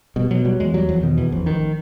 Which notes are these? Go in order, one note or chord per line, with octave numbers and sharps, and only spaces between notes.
B2 G3
B2 F#3
F#3 G3
E2 G#3
F#3 G3
E2 F3
B2 D#3
E2 E3
A1 F3
D#3